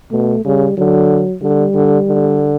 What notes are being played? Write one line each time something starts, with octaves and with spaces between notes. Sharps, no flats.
B2 A3
C#3 G3
D3 F#3
D3 G3
D3
D3